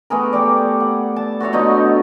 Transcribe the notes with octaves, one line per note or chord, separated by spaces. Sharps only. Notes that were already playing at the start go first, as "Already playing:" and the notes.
A3 B3 G#4 A#4
G4 A4 D5
F#5
A5
F#4 A4 C#5 E5
B2 D3 A3 D#4